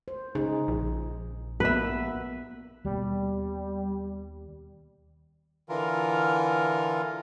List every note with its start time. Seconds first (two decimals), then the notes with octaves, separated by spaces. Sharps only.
0.08 C5
0.35 C#3 D#4 G#4
0.68 A#1
1.60 A#3 B3 B4 E5
2.85 D#2 B2 G3
5.69 D3 E3 F4 A#4